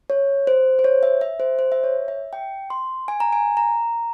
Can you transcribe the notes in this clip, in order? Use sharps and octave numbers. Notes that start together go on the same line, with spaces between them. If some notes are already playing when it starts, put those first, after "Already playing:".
C#5
C5
C5
C#5
E5
E5
C5
C5
E5
C#5
E5
G5
C6
G#5
A#5
G#5
A#5